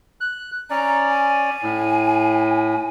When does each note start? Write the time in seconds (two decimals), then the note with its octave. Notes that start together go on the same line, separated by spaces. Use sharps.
0.21 F#6
0.70 C#4 D5 A#5
1.10 G#5
1.63 A2